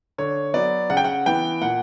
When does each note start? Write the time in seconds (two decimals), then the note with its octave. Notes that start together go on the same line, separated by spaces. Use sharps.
0.18 D3 C#5
0.54 F#3 B3 D5
0.90 C#3 F#5
0.97 G5
1.04 F#5
1.26 E3 B3 G5
1.62 A#2 F#5